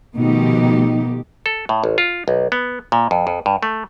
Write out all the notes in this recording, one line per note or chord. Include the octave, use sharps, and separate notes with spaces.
B2 D#3 F3 A3 D#4 G4
A4
A2
A1
F4
B1
B3
A#2
F2
F2
G2
A3